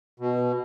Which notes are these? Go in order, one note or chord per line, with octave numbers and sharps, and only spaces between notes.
B2